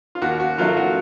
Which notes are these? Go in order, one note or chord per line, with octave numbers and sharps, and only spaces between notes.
F4
D#2 F#4
F#4
D#3 F#3 A3 F4
F#4